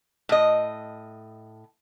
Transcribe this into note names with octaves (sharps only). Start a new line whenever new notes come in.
A2 D#5